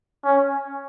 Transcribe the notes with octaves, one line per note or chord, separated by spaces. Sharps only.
C#4